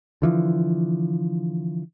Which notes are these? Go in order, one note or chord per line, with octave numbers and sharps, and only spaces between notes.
D3 E3 F3